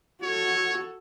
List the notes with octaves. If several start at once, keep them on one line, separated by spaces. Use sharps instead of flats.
F#4 A4 C#5